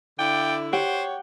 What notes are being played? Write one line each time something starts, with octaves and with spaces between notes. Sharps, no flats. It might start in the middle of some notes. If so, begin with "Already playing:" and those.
D3 E4 D5 G5
G4 C5 C#5 F#5 G5